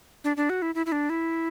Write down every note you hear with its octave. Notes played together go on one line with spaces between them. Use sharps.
D4
D4
F#4
E4
E4
E4
D4
E4